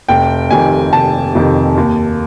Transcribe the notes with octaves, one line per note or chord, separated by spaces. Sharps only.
F1 G5
F2 C3 D#3 G#5
F1 A5
F2 C3 D#3
D#2